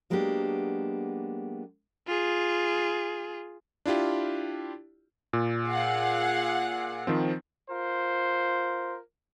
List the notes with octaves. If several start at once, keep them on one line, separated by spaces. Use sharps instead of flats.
F#3 G#3 A#3 B3 D4 G4
F4 G#4
D4 E4 F4 G4
A#2
G#4 F5 F#5
D#3 F3 C4
F4 A#4 C5